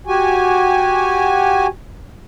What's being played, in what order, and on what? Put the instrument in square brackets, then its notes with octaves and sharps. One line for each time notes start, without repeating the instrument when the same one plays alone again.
[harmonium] F#4 G4 G#5